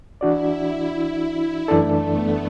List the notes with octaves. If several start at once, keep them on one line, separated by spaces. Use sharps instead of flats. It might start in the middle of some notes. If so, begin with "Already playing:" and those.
E3 D4 E4 F#4 D5
F#2 E3 A3 D4 A4 D5
B3